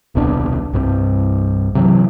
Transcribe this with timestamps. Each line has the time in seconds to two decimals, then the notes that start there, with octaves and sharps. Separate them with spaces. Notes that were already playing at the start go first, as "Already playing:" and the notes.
0.15 D#1 C2 B2 D4
0.73 C2 G2 G3 C4
1.75 C3 E3 F#3